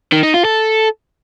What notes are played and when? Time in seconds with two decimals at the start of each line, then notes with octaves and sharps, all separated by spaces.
0.12 D#3
0.23 D#4
0.34 F4
0.45 A4